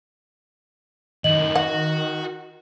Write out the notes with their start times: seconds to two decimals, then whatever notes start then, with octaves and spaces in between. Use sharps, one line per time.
1.24 F#2 A2 D#3 D#5 F#7
1.56 F#4 F#5